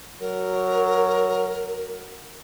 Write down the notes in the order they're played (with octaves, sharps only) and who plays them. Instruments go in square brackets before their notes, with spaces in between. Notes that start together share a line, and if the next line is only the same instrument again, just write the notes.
[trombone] F#3 [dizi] A#4